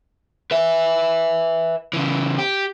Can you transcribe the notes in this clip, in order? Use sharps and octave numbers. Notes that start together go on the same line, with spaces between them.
B4 E5
C#3 E3
G4